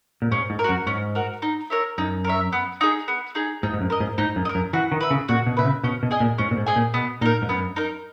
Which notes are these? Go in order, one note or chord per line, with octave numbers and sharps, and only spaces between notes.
A#2
G#2 C#4
G#2
A#4
F#2 F#4
G#2 C#4
F#4 A#4
D#4
A#4 C#5 E5
F#2 D#4
A#4 C#5 E5
B3
D#4 G#4
B3
D#4 G#4
G#2 D#4
G#2
F#2
A#4 D#5
G#2
G#2 D#4
F#2
D#5
A#4
F#2
E3 F#4
D#3
B4 E5
C#3
A#2 F#4
B2
B2 B4 E5
C#3
B2 C#4
B2
G#4 D#5 G#5
A#2
G#2 C#4
A#2
G#2
G#4 D#5 G#5
A#2
B2 B3
A#2 D#4 A#4
G#2
F#2 B3
D#4 A#4